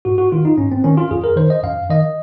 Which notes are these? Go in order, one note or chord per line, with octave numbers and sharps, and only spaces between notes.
G#2 F#4
F#4
D#3 F4
D#4
G#2 C#4
C4
D#3 C#4
F4
F#2 G#4
A#4
D#3 C5
D#5
F#2 F5
D#3 D#5